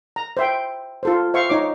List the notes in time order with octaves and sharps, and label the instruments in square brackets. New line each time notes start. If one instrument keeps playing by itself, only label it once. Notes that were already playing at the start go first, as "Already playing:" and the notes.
[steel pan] A#5
C5 E5 G5
F4 A4 C5
C5 E5 F5 C#6
D#4 C#5 D6